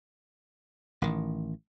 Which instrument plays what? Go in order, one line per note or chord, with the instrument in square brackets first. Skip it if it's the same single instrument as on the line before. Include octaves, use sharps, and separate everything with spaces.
[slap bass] A1 D#3